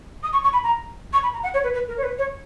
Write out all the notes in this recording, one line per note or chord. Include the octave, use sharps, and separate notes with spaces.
D#6
C#6
C#6
B5
A#5
C#6
B5
A#5
F#5
C#5
B4
B4
A#4
C#5
B4
C#5